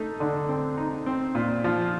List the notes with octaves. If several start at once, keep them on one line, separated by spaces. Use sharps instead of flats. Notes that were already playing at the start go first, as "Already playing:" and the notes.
Already playing: A3 D#4
D3
C4
D#4
C4
A#2
F3